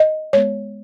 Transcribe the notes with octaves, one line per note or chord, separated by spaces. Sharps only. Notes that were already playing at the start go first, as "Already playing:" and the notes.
Already playing: D#5
G#3 B3 C#5